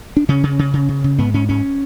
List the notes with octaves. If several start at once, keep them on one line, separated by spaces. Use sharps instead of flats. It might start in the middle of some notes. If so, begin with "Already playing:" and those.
D4
C#3 C#4
C#3
C#3
C#3
C#3
C#3
G#2 B3
G#2 C#4
G#2 C#4